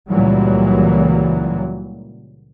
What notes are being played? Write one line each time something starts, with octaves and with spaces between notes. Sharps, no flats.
C#2 A#2 E3 F#3 G3